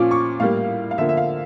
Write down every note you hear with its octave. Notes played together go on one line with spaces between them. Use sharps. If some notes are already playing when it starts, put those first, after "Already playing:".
Already playing: A#2 F3 C#4 F4 D6
C#6
A2 G3 A#3 F5
F5
D3 F3 A#3 E5
E5
F5